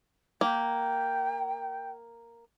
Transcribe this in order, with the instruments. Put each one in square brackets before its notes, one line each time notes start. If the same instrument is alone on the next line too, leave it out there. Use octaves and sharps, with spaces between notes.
[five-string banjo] A#3 [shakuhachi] G5